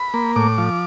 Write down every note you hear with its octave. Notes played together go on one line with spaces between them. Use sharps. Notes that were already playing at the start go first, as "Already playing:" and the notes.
Already playing: B5
A#3
A2 D6
F3